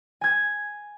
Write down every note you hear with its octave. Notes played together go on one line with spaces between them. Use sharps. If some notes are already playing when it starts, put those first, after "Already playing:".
G#5 G#6